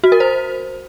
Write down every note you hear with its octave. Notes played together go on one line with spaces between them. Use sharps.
F#4
A#4
C5